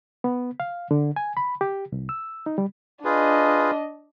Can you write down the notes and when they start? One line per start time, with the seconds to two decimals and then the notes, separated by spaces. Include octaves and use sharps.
0.24 B3
0.60 F5
0.91 D3
1.16 G#5
1.37 B5
1.61 G4
1.92 C2
2.09 E6
2.46 D#4
2.58 G3
3.05 D4 F4 G#4 B4 D#5